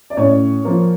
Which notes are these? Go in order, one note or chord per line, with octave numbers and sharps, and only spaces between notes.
D5
A2 C#4 C#5
F3 A#3